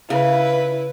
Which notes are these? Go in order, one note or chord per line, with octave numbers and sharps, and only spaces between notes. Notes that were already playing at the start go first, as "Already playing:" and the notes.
C#3 E4 B4